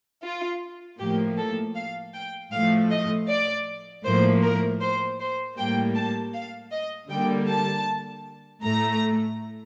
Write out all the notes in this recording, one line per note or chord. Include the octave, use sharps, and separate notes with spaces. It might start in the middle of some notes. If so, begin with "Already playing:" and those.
F4
A2 F3 A#3 G4
A4
F5
G5
A2 F3 A3 F5
D#5
D5
A2 F3 A#3 C5
A#4
C5
C5
A2 G3 A#3 G5
A5
F5
D#5
D3 G3 A#3 G5
A5
A2 A3 A#5